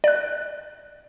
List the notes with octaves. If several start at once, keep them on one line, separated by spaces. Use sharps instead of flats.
D5 F#6